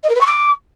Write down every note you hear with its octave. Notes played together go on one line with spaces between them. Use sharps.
D#5
A#4
B4
C#6
D6